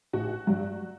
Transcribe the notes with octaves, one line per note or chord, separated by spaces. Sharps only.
A1 F#4
G2 F#3